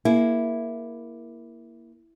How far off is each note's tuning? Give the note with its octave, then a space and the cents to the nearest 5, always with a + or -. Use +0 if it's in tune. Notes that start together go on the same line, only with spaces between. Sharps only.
A#3 +15 E4 +0 G#4 +25